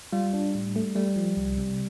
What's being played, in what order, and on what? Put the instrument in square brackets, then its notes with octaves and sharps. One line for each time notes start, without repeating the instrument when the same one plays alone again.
[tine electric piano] G3 [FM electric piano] F4
[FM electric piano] D4
A2
A3
[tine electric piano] G3 [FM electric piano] A3
[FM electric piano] F3
C2
C3